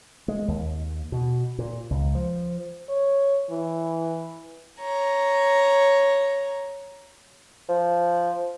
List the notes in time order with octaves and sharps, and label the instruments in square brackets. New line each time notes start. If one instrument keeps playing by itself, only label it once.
[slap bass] G#3
D#2
B2
A#2
C#2
F3
[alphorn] C#5
E3
[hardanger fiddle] C#5 A#5
[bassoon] F3